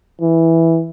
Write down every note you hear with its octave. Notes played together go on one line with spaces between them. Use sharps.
E3